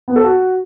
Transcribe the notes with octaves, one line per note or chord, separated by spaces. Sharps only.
B3
A4
F#4